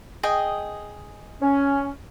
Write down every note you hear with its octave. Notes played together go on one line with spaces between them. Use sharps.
G#4 D#5 G5
C#4